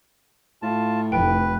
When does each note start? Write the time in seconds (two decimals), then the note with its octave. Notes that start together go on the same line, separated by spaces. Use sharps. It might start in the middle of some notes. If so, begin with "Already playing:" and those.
0.62 A2 F4 A5
1.12 F1 B4 G5